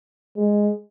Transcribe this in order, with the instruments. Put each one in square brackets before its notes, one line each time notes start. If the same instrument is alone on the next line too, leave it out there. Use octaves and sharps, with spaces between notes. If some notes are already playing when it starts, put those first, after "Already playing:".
[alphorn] G#3